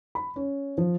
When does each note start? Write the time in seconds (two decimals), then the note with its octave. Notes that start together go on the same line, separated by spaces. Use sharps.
0.15 B5
0.36 C#4
0.78 F3